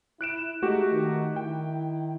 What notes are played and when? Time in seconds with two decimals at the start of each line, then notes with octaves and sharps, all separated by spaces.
0.21 E4 F#6 D7 E7
0.62 G#3 A3 D#4 F#4 G4
0.92 D#3
1.36 D#3 E4 G5